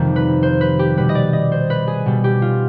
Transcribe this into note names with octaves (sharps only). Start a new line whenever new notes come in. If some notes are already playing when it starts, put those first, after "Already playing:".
Already playing: F2 C3 D#3 G3
B4
C5
B4
G4
B2 G3 B4
D#5
D5
D#5
C5
B4
G#4
B2 G3
G4
F4